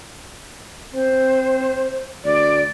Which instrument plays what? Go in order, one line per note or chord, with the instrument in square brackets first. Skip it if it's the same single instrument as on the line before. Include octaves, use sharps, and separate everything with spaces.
[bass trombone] C4 [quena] C5
[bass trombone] D2 [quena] D5